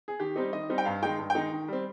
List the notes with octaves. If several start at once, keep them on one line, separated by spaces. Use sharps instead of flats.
G#4
D#3 G4
G3 C4 D#4
D#3 D#5
G3 C4 D#4
G5
G2 F5
D#3 G#3 D#4 G5
G2
G5
D#3 G#3 D#4
D#3
G3 C4